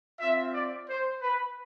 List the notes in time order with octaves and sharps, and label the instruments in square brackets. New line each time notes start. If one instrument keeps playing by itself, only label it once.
[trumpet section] C4 F4 E5
D5
C5
B4